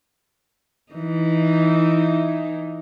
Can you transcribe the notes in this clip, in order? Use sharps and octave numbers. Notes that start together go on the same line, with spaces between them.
E3 D#4